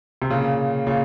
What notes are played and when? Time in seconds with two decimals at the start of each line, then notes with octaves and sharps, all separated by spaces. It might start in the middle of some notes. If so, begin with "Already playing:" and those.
0.22 C3
0.30 A#2 C#3
0.87 A#2 C#3